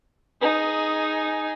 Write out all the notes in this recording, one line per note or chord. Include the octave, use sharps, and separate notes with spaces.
D#4 G#4